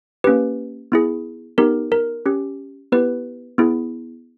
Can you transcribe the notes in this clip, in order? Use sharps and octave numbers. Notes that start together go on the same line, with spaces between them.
A#3 C#4 G4 B4
B3 E4 G#4
B3 D#4 G4 A#4
A#4
C#4 G4
B3 E4 G4 B4
B3 E4 G#4